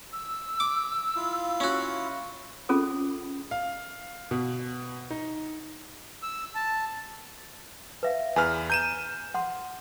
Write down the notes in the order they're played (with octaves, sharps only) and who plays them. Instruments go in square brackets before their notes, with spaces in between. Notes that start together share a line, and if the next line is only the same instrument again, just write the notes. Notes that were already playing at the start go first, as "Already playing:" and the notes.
[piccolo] E6
[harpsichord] D6
[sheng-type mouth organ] E4 F4 F5
[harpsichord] C#4 F#4
[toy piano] C#4 F4 G#4 A4 D#6
[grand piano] F5
B2
D#4
[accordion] E6
A5
[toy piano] B4 E5 F5
[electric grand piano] E2 B4 F6 [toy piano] G#5
[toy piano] A#5 [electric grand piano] G6 D#7 E7
[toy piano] F#5 C6